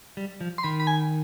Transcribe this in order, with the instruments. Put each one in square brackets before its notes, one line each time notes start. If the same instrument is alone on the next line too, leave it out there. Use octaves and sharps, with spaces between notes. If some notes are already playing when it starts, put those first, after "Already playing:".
[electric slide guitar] G3
F3
[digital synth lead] C6
[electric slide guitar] D#3 [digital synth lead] B5
[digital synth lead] B5
G#5